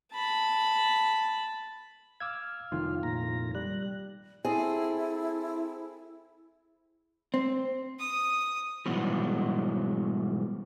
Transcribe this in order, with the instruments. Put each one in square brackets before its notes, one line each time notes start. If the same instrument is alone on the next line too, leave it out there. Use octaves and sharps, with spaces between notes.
[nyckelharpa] A5 B5
[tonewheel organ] F5 [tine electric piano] D6 E6 G#6
[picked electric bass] F1 D#3 [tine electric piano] F4
[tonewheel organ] A#2 A#5
[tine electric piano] G3 [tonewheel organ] F#6
[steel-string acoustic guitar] C4 G#4 A4 [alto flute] E4
[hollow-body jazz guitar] C4
[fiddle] D#6
[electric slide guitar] G#2 B2 E3 F#3 G3